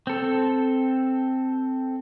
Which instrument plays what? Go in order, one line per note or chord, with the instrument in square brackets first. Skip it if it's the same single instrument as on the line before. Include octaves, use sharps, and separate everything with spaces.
[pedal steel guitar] C4 A4